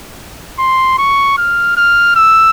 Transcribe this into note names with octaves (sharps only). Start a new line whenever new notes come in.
C6
C#6
F6
F6
E6